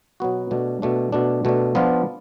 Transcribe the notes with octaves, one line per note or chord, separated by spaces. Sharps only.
B2 F#3 B3 F#4
B2 A3 D4
B2 A3 D4
B2 A3 D4
B2 A3 D4
F3 B3 D4 F4